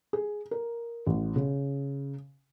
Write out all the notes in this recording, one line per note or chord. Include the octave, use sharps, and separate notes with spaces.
G#4
A#4
A1
C#3